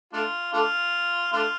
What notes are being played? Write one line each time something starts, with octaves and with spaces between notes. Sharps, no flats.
A3 D4 F4
A3 D4 F4
A3 D4 F4